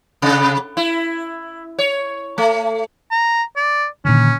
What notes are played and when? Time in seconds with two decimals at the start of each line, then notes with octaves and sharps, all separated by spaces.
0.22 C3
0.77 E4
1.79 C#5
2.38 A3
3.11 A#5
3.56 D5
4.05 A#2 D3 D#3 C#4